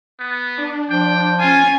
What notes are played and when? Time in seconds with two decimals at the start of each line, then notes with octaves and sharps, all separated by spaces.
0.19 B3
0.57 D4
0.90 F3 G5
1.40 C#4 F4 G#5